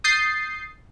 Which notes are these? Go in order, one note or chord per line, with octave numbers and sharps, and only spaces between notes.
D#6 G6 A6 C7